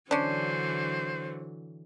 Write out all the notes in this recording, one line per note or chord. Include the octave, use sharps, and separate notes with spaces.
D3 E3 F#3 C#4 D4 C5